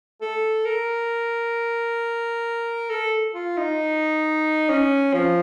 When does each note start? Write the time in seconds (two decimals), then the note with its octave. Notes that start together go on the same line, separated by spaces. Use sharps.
0.22 A4
0.65 A#4
2.90 A4
3.34 F4
3.58 D#4
4.70 C#4
5.14 F3